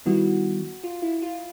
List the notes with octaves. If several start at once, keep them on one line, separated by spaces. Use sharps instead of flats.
D#3 G3 B3 E4 F#4
F4
E4
F4